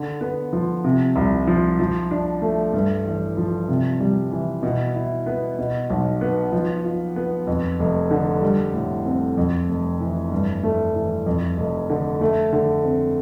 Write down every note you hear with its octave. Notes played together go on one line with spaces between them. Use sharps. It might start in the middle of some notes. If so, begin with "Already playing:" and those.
Already playing: D3
B3
F3
C3
C2
F3
F3
D4
A3
G2
A1
F3
C3
G3
E3
B2
E4
B3
B2
B1
B3
F3
F4
B3
F2
F1
D3
G3
A2
C4
F2
F1
E3
G2
A3
E3
F2
F1
D3
A3
D3
C4